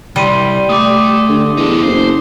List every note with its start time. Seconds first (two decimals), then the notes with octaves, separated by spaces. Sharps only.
0.16 C2 G3 C6 D#7 G7
0.69 A3 D6 D#6
1.29 D3
1.57 E2 D#4 A4
1.83 F#1 C5